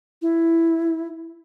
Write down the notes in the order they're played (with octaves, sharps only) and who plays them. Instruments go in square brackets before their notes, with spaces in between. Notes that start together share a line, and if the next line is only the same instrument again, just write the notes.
[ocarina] E4